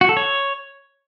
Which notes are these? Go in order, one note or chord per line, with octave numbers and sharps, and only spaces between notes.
F#4
A4
C#5